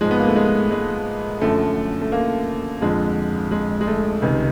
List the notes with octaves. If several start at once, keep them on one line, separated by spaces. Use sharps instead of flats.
G#2 F3 G#3
B3
A#3
A3
G#3
G#3
F#2 D3 F3 A3
A3
A#3
F2 D3 F3 G#3
G#3
G#3
A3
C#2 C3 D#3